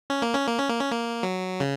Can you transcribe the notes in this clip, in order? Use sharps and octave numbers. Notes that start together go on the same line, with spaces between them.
C#4
A#3
C#4
A#3
C#4
A#3
C#4
A#3
F#3
C#3